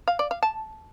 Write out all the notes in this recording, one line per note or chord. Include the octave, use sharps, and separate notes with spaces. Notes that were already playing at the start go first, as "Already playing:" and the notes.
F5
D5
F5
A5